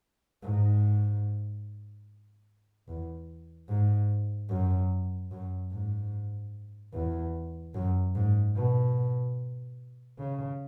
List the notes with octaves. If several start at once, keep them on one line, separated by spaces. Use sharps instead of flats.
G#2
E2
G#2
F#2
F#2
G#2
E2
F#2
G#2
B2
C#3